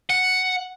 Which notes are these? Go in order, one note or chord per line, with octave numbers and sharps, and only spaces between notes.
F#5